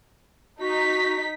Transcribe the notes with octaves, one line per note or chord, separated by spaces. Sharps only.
D#4 F#4 B6